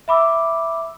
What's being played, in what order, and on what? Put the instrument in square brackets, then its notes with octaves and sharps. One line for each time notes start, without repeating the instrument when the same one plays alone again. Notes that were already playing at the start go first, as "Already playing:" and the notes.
[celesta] E5 B5 D6 E6